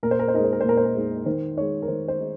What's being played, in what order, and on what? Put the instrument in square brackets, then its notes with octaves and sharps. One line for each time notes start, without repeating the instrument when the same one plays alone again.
[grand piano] A#2 A#4
C5
A#4
C5
G#3 D#4 A#4
C5
A#4
C5
A#2 A#4
C5
A#4
G#3 D#4
D#3 C5
G#3 D#4 C#5
A#4
D#3 C5
C5
G#3 D#4